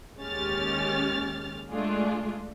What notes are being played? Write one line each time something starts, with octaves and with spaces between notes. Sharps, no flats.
D#2 G#3 C#4 G4 F6 A6
G#3 A3 D4 F4 G#4